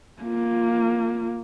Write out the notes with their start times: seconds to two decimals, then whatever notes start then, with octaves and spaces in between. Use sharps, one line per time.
0.22 A#3 F4